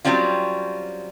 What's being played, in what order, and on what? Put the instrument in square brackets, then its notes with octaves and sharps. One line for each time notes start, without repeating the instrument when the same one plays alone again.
[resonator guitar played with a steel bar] F#3 G3 C4 C#4 F4